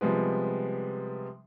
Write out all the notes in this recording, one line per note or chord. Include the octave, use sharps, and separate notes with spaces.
C3 F3 G3 G#3 B3